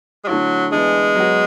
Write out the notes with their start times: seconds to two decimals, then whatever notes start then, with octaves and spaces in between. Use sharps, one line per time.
0.24 G#3
0.28 D3 F#3 A3 E4
0.72 E3 G#3 B3 D4
1.16 F#3 B3 F#4